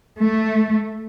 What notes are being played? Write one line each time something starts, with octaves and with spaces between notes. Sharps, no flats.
A3